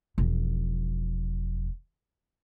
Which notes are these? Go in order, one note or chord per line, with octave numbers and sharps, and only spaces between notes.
E1 F3